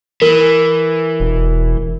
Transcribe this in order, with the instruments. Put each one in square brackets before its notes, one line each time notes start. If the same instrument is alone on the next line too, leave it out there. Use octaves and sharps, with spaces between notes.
[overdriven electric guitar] E3 [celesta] A#4
[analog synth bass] E1